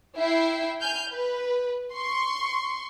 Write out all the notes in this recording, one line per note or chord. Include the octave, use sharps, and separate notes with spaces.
E4 E5 G5 C7
G#5 F6 G6
B4
C6 C#6